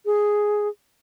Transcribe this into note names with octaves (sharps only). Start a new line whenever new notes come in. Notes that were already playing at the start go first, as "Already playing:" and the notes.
G#4